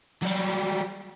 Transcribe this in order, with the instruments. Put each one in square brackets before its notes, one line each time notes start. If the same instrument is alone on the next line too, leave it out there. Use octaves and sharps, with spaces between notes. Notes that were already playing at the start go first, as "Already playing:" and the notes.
[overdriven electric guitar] F#3 G3